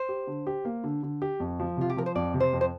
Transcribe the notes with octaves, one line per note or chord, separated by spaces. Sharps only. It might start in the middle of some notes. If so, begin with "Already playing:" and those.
Already playing: C5
G4
D3
G4
A#3
D3
D3
G4
F2
F3
C3 F4
G4
F3 A#4
C5
F2 D5
C3
C5
F2
C5